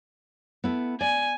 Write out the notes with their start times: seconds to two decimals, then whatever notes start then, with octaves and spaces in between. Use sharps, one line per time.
0.64 B3 E4 A4
1.01 D5 G#5